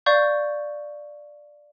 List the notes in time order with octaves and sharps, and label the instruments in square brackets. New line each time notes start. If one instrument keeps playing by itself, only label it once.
[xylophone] D5 F5 C#6 G6